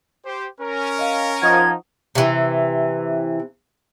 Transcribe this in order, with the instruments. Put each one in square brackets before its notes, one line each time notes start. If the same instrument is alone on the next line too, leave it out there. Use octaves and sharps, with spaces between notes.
[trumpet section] G4 C5
C#4 A#4
[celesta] D#5 F5
[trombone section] F3 D#4 [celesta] F#5 C#6 D#6 [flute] G#6
[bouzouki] C3 E3